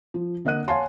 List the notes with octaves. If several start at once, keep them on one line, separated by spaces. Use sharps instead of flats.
F3
D3 A#3 D#5 F#5 F#6 D#7
C#5 F5 F#5 G#5 A5 C6